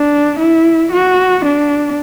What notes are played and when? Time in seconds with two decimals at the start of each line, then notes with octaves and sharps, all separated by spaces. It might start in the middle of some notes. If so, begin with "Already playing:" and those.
Already playing: D4
0.39 E4
0.92 F#4
1.45 D4